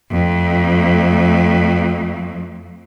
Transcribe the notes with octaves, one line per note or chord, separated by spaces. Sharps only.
F2 A3